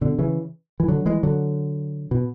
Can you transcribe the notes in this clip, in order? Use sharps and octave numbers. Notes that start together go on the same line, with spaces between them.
B2 D3
C#3 E3
E3
D3 F#3
E3 G#3
D3 F#3
B2